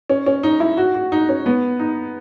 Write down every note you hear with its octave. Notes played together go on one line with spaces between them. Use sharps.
C#4
C#4
D#4
E4
F#4
F#4
D#4
C#4
B3
D#4